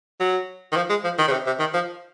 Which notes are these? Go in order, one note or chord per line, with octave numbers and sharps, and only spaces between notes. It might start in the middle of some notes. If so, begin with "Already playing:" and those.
F#3
D#3
F3
G#3
F3
D#3
C#3
C3
C3
D#3
F3